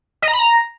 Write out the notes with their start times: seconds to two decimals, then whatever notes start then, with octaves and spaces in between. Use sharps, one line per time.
0.22 D#5
0.28 A#5
0.33 B5
0.39 A#5